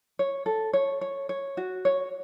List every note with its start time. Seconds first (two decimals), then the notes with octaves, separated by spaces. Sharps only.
0.19 C#5
0.46 A4
0.73 C#5
1.01 C#5
1.29 C#5
1.57 F#4
1.85 C#5